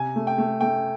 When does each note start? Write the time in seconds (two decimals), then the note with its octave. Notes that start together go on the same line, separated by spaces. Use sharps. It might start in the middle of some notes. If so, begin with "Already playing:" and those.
Already playing: C3 G#5
0.16 A3
0.27 G5
0.38 A3
0.61 A3 G5